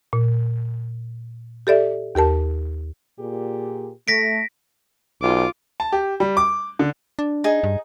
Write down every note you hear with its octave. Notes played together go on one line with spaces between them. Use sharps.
A#2
G4 A4 D5 E5
D#2 G4 A#4 A5
A#2 G4 G#4
A3 A#6 B6 D7
B1 F4 D6
A5
G4
G3
D6
D3
D4
D#4 G#4
G2